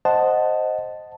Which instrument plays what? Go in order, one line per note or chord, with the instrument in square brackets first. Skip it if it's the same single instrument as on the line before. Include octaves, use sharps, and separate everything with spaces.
[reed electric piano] C5 D#5 F#5 [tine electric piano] A5